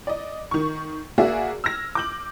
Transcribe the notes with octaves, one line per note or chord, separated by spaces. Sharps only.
D5 D#5
D#3 C#6
A#3 F#4 G#4 D5 E5
E6 F6 G#6 A#6
D6 G6 F#7